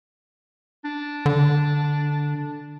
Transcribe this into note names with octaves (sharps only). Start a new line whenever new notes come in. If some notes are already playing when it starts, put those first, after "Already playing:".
D4
D3